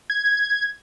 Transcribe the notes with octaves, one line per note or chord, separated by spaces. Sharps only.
G#6